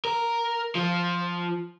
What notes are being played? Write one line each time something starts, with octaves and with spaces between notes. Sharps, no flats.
A#4
F3